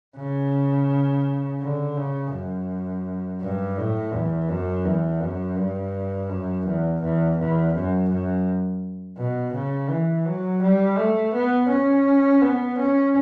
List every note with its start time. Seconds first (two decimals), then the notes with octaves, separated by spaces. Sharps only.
0.17 C#3
1.61 D3
1.97 C#3
2.33 F#2
3.41 G2
3.77 A2
4.13 E2
4.49 F#2
4.85 E2
5.21 F#2
5.57 G2
6.29 F#2
6.65 E2
7.01 E2
7.37 E2
7.74 F#2
8.09 F#2
9.17 B2
9.54 C#3
9.90 E3
10.25 F#3
10.62 G3
10.98 A3
11.34 B3
11.69 C#4
12.42 B3
12.78 C#4